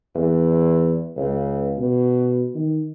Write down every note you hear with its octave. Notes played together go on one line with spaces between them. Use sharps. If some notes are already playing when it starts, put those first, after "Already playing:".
E2
C#2
B2
D#3